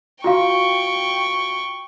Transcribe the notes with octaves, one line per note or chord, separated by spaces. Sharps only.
F4 F#4 F5 G5 C#6